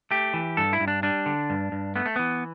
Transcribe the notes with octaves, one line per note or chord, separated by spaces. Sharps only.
A3 G4
E3
G2 A4
E4
G2
D4
G3 D4
D3
G2
G2
A3 B3
A3
E3 B3